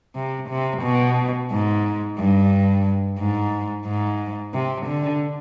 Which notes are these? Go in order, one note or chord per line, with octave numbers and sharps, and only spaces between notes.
C3
C3
B2
G#2
G2
G#2
G#2
C3
D3